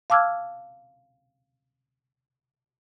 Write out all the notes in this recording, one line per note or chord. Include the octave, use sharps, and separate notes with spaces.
F5 A5 D6 E6 F6 G#6